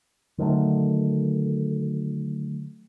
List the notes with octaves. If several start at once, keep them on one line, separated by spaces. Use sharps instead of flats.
D3 D#3 F#3 A3